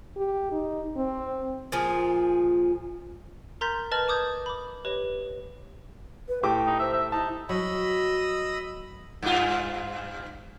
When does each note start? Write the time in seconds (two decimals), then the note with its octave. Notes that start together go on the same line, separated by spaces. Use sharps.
0.17 G4
0.52 D#4
0.97 C4
1.72 A#2 F3 G#4
3.61 A#4 A#5 C6 G6 A6 B6
3.92 B4 D#5 A5 F6 A6 F#7
4.08 A5 D6 D#6 G6 G#6
4.46 B5 D6
4.85 G4 B4 C#5 D#5
6.28 B4
6.43 A2 G4 G5 D6
6.67 D#4
6.79 C5 E5
6.94 E5
7.12 D#4 E4 A5
7.49 F#3 D#5 B5 E6
9.22 G2 F4